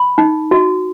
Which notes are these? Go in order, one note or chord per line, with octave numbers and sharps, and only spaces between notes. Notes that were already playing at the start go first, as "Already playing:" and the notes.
Already playing: B5
D#4
F#4